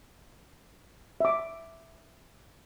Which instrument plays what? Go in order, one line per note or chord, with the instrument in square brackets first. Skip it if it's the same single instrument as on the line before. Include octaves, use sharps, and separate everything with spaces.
[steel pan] E5 D6